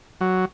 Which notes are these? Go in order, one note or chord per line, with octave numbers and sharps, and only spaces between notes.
F#3